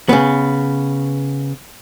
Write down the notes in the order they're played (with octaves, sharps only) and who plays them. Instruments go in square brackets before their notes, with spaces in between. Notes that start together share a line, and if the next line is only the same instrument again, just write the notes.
[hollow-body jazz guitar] C#3 B3